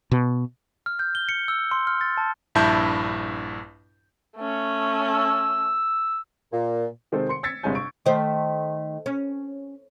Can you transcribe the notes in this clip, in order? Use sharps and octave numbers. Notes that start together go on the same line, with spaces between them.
B2
F6
G6
G7
C#7
E6
C6
F6
A6
A5
A#1 G2 E4 E5 A5 G6
A3 C#4
E6
A#2
C3 D#3 G#3 C4 A4 C5
C6 C#7
E6 G#6 A6 B6 C#7
G1 C3 G#3 C#5 G#5 G6
C#6 D7
D#3 A3 C5
C#4